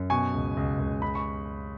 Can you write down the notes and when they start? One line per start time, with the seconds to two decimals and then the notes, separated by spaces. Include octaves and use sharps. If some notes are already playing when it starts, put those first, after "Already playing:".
Already playing: F#2
0.10 B2 G#5 C#6
0.33 C#2
0.57 C#2
0.80 C#2
1.02 C#3 B5
1.15 C#6